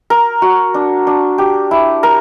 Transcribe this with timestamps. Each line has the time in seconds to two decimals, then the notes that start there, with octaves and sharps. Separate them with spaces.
0.10 A#4
0.42 F#4
0.74 D4
1.07 D4
1.38 G4
1.71 E4
2.03 A#4